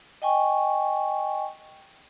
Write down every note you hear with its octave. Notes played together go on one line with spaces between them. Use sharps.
D#5 G5 G#5 C#6